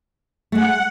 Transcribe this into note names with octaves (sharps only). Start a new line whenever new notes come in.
G#3 A3 F#5